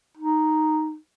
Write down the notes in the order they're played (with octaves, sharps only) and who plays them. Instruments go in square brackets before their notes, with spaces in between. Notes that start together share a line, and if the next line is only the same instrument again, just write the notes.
[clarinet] D#4